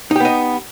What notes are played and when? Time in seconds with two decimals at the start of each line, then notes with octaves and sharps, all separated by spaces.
0.11 D#4
0.16 G4
0.20 B3
0.25 D#5